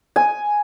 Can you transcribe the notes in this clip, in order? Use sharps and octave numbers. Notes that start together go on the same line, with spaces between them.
G#5